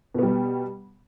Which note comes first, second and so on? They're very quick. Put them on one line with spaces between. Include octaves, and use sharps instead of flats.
B2 B3 G3